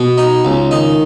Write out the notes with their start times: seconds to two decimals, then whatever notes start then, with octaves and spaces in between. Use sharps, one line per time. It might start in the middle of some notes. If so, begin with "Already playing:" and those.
Already playing: B2
0.18 D#4
0.45 C#2
0.71 D#3 D#4